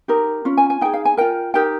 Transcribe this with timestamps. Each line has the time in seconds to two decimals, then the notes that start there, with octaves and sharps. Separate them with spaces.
0.08 D#4 G4 A#4
0.45 C#4 F4
0.57 G#5
0.70 G#5
0.81 D#4 G#4 G5
0.93 F5
1.05 G#5
1.17 F4 A#4 G5
1.54 D#4 G4 A#4 G5